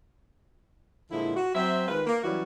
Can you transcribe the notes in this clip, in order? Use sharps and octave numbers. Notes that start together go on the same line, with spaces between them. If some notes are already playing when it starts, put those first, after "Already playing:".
A#2 D3 F3 G#3 E4
F#4
F#3 C4 E5
D#3 G#3 F4 B4
A#3
E3 F#3 G3 C#4 E4 F#4